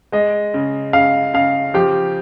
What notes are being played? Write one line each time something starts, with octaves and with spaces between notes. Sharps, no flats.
G#3 D#5
C#3
C#3 F5
C#3 F5
F3 G4